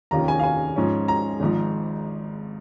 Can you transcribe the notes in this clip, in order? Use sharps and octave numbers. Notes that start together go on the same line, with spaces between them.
F1 D#2 D#3 C#4 F4 A#5
G#5
F5
G#5
G#2 F3 C#4
A#5
G#1 G#2 F3